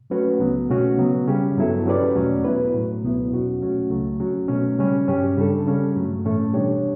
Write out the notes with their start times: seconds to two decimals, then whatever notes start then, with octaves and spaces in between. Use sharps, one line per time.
0.10 F#3 A3 C#4 F#4 B4
0.39 C#2 C#3 F#3 B3
0.69 B2 A3 C#4 F#4
0.98 C#3 F#3 B3
1.28 C#3 G3 C#4 G4
1.56 G2 F#3 B3 E4 A4
1.85 F#3 C#4 G4 B4 D5
2.15 E2 B2 F#3 A3 C#4
2.44 F#3 B3 E4 B4
2.74 A2 F#3 A3
3.03 C#2 B2 F#3 B3 E4
3.32 E2 B2 F#3 C#4 F#4
3.61 F#3 A3 C#4 F#4
3.90 C#2 C#3 F#3 A3
4.20 F#3 C#4 F#4
4.48 B2 F#3 A3 C#4
4.78 C#3 G3 C#4
5.08 G2 F#3 C#4 G4
5.36 C#3 G3 D4 A4
5.66 C#3 G3 C#4
5.95 G2 F#3 A3
6.25 A2 E3 A3 C#4
6.53 B2 G3 D4 G4 C#5